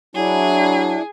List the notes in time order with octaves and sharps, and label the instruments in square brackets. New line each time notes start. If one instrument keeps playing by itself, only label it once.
[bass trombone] F#3 [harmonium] D4 E4 [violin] G#4